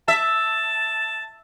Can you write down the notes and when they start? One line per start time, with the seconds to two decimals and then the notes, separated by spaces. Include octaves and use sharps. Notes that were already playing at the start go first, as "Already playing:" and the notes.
0.08 E5 A5